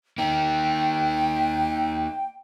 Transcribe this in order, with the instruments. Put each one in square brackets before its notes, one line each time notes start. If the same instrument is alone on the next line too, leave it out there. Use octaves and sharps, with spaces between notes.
[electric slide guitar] A#3 D#4 [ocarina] G5